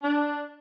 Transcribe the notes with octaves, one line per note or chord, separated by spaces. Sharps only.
D4